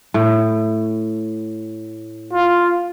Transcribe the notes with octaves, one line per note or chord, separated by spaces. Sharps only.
A2
F4